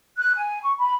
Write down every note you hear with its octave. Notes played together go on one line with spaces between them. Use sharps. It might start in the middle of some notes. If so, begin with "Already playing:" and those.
F#6
G#5
C#6
B5